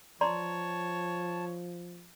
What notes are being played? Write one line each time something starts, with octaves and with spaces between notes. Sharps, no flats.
F3 C#5 D5 A5 A#5 C6